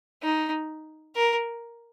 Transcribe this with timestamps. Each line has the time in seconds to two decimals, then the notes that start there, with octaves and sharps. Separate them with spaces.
0.23 D#4
1.16 A#4